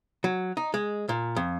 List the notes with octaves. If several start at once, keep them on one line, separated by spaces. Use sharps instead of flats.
F#3
D#4
G#3
A#2
F2